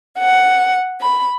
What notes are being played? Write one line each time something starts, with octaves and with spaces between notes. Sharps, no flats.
F#5
B5